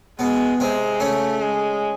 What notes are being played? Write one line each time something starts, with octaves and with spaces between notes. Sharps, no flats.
B2 G#3 B3
C3 G#3 C4
C#3 A3 C#4
G#3